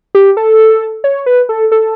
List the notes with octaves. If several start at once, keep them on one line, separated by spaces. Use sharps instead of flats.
G4
A4
C#5
B4
A4
A4